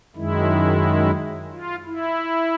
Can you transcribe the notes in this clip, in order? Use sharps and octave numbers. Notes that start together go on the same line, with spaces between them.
F#2 D#3 G#3 E4
F4
E4